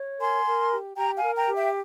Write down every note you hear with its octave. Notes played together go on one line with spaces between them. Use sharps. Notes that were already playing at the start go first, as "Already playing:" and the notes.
Already playing: C#5
A#4 G#5 C6
A#4
G4
G4 G5 A#5
F5 G#5
A#4
G5 A#5
G4
E5 G5